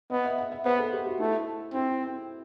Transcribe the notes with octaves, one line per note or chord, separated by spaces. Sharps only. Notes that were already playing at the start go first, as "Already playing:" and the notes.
B3 D#5
E5
F#5
E5
B3 C5
A4
G4
F#4
A3 E4
C4 E4